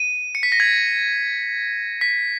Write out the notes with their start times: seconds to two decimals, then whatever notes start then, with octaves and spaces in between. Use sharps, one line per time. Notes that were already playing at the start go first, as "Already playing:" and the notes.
Already playing: D#7
0.35 C#7
0.43 B6
0.52 A#6
0.60 G#6
2.01 B6